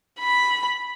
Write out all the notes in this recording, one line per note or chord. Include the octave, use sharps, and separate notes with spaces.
B5